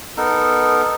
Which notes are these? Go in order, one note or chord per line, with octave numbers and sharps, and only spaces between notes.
B3 D#4 A4 A#4